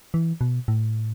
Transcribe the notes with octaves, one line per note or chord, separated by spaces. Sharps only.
E3
B2
A2